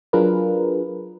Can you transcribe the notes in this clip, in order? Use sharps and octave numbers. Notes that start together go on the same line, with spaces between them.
F#3 D4 F4 G#4 A#4 B4